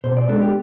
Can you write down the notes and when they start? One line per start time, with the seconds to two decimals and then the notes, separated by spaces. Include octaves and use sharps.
0.04 B2 C5
0.17 D5
0.28 G#3 B3 D4 A4
0.42 G4